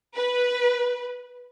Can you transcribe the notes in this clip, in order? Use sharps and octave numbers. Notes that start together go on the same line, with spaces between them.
B4